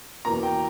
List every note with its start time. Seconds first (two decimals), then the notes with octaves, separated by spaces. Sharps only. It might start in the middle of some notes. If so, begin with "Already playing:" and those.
0.25 E2 B2 A#3 A#5
0.43 G5